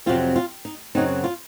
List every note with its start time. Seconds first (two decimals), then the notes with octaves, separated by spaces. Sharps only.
0.06 F2 C3 F#3 C4 F4
0.36 F4
0.65 D#4
0.95 F#2 C#3 F#3 C4 D#4
1.24 F4